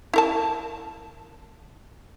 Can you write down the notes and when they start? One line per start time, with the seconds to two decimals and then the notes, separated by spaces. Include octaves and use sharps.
0.14 E4 A#4 A5